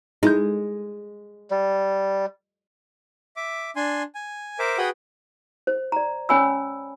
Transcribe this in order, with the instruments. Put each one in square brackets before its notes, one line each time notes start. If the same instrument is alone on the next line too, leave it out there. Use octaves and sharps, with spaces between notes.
[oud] G#3 [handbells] D#4 E4 G6
[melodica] G3
[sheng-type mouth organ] E5 D6
D4 G#5 C6
G#5
A#4 C5 E5 D6
F#4 G#4 B4 F#5 G5 D#6
[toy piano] C5
D5 A#5
C#4 C#5 G#5 B5 E6